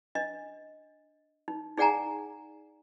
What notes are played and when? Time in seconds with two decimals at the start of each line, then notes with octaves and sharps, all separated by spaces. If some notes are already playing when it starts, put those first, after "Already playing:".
0.15 D4 D#5
1.48 D#4
1.77 D#4 G#4 D5 F#5 G#5 A#5